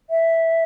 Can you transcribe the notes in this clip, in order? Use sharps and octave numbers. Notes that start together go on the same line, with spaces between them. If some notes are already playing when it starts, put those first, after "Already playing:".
E5